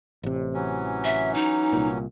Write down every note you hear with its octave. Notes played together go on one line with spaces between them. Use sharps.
A1 C3
E3 F#3 C#4
E5
D#4
C2 A#2